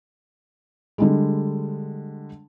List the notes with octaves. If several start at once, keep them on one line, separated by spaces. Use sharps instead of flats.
D3 G3 G#3